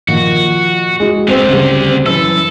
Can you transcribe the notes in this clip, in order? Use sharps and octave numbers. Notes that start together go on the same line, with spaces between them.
A#2 D#3 F3 F#4
G#3 F#4
D2 D3 C4 C5
C#3 G3
F#2 E3 A4 E6